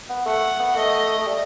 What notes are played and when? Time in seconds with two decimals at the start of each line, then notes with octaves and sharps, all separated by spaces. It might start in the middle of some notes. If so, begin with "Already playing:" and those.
0.10 B3
0.26 A3 F#5
0.60 B3
0.76 A3 D#5
1.19 A3
1.26 G3